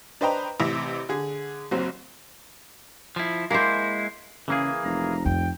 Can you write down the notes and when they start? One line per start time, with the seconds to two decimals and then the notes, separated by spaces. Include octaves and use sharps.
0.21 D4 B4 C5 D#5 G5 A#5
0.60 A1 C3 E4 E5 A#6
1.09 D3 G#4
1.71 F#1 F#3 C4
3.16 F3 E4
3.51 G#3 A#3 E4 C5
4.48 C#3 E3 A#3 G#4
4.84 F1 A#5
5.25 F2 G5